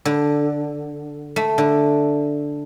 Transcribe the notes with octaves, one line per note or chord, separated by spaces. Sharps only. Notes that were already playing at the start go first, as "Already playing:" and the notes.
D3
A3
D3